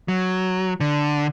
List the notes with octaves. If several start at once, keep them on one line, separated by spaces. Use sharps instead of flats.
F#3
D3